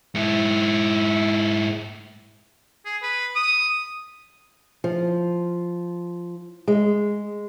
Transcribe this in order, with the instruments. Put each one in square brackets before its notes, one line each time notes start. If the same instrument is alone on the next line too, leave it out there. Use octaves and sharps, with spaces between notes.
[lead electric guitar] G#2 E4
[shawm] G#4
B4
D#6
[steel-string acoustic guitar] F3
G#3